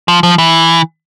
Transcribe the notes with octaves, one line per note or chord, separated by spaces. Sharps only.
F3
F3
E3